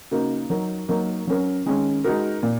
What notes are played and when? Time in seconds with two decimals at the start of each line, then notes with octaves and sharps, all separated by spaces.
0.11 C#3 A#3 D#4 F#4 A#4
0.50 F#3 D#4 A#4
0.88 F#3 A#3 D#4 A#4
1.27 F#3 C#4 A#4
1.66 D#3 G#3 C#4
2.04 G#3 D#4 F#4 A#4
2.43 A#2